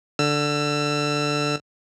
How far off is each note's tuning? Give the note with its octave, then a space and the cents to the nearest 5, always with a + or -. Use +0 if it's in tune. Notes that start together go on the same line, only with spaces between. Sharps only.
D3 +0 E6 +25